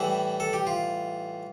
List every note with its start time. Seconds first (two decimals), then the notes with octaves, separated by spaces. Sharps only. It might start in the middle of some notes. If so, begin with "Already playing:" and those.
Already playing: A2 E3 G3 E4
0.40 A4
0.53 G4
0.67 F4